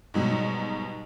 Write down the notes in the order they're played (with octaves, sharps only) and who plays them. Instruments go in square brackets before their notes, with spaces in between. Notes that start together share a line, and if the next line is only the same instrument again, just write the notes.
[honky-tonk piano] G#2 B2 F#3 G3